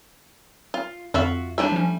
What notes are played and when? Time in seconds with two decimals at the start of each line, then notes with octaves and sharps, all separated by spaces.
0.74 F4
1.14 F2 D3 F4 F#4 E5
1.58 G3 A3 D4 E4 E5
1.72 F3 C#4